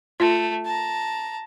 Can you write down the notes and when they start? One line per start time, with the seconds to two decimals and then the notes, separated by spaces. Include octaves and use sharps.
0.20 A3 F4
0.65 A5 A#5